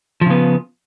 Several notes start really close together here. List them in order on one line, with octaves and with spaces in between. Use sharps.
F3 C#3 B3